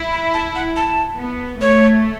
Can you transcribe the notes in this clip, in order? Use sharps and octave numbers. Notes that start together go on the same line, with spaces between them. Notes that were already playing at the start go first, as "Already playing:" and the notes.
Already playing: E4
B5
A5
F#5
A5
B3
A3 C#5